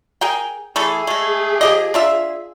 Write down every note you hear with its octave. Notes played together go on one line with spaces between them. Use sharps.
G#4 A#4 G5
E3 A3 G#4 A4
G#3 A3
F3 G4 D#5
D4 F4 E5